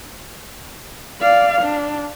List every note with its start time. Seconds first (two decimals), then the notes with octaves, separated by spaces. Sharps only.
1.21 D5 F5
1.61 D4